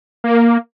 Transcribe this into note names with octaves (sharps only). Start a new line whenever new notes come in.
A#3